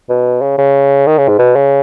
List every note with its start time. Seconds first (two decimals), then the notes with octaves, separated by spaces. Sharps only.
0.09 B2
0.41 C#3
0.58 C#3
1.06 D#3
1.18 C#3
1.28 G#2
1.38 B2
1.56 C#3